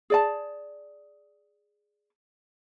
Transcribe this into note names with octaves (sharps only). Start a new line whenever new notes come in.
G#4 D5 A5